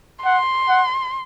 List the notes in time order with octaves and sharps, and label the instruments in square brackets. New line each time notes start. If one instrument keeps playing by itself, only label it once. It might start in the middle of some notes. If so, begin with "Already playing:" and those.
[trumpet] F#5 [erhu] C6
[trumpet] F#5